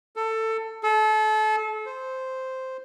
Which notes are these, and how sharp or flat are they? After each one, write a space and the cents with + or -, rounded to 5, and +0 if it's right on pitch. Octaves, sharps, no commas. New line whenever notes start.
A4 +20
A4 -30
C5 -5